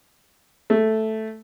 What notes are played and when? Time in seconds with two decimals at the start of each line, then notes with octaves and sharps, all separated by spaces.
0.70 A3